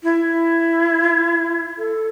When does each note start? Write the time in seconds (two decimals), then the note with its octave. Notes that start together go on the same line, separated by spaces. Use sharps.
0.04 E4
1.78 A4